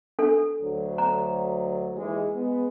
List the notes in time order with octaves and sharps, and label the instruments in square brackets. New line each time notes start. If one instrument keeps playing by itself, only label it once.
[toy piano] D4 A4
[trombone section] D2 F#3
[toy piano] A#5
[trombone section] D#2 E3 G#3
G#3 B3